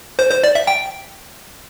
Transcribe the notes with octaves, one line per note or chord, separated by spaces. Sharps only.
C5
C5
D5
E5
G5